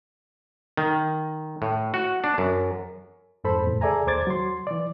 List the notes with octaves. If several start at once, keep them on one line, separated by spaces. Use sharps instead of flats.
D#3
A2
F#4
D4
F#2
F2 G#2 A4 C5 B5
E2 A2
G#4 A4 D5 E5 G#5 A#5
D#2 C5 D6 G#6 A6
F#3 C6
E3 D5